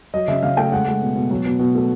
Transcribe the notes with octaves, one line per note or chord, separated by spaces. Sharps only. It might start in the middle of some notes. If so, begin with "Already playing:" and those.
F#3 D#5
C#3 E5
C#3 F5
A3 G5
G#3 F#5
G#3
B2
B2
F#3
B2
B2
A3